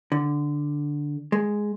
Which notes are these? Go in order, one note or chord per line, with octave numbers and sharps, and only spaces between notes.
D3
G#3